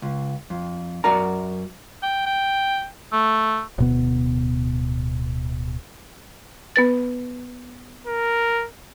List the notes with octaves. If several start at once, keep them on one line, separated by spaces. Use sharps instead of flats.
C#2
F2
F#2 F#4 A#4 D5 A#5
G5
G5
A3
D1 B2 B3
B3 B4 A6
A#4